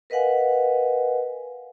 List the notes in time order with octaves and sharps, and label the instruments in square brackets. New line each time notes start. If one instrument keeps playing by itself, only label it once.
[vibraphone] A#4 B4 D#5 F5 F#5 G#5